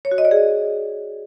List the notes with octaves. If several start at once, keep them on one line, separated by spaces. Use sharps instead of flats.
C#5
F#4
D#5
D5
G#4